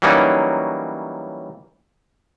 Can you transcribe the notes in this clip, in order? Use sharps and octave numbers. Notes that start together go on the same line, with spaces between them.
E3 F#3 G3 A#3 C#4 D#4